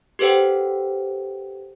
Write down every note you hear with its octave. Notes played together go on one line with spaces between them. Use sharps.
G4 A4 B4 C5 F#5 G5